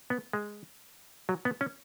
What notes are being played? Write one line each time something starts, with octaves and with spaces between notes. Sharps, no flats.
B3
G#3
F#3
B3
C#4